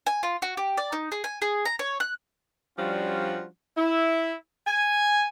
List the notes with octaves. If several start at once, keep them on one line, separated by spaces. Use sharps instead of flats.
G#5
F4
F#4
G4
D5
D#4
G#4
G#5
G#4
A#5
C#5
F#6
F3 G3 C#4 D4 F4 F#4
E4
G#5